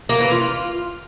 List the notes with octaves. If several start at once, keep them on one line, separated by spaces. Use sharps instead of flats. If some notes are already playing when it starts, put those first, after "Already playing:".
A#3
E3
F4